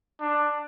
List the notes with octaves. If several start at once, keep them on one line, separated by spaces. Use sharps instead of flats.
D4